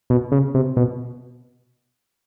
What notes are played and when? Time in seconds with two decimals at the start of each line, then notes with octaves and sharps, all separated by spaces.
0.10 B2
0.32 C#3
0.55 C3
0.77 B2